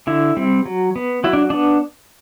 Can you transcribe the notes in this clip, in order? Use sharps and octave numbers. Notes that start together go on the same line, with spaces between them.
D3 E4
G3 C4
F#3
B3
F#3 E4
D4
B3 D4